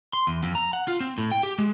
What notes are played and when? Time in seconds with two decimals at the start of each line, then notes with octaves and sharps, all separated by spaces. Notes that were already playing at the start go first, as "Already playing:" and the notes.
0.13 C6
0.27 E2
0.43 F2
0.55 A#5
0.73 F#5
0.88 F4
1.00 C4
1.18 A2
1.31 G5
1.43 G4
1.58 G#3